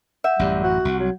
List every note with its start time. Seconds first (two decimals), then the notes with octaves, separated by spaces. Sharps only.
0.24 E5 F#5 G6
0.39 A1 F#2 G3
0.63 F#4
0.85 C2
0.99 F#3